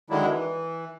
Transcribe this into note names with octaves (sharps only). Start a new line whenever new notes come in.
D3 D#3 F#3 G#3 D4 E4
E3